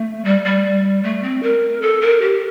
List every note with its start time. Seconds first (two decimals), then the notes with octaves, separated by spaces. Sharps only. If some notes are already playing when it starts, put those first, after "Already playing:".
Already playing: A3
0.25 G3
0.45 G3
1.03 A3
1.23 C4
1.43 A#4
1.82 A4
2.01 A#4
2.21 G4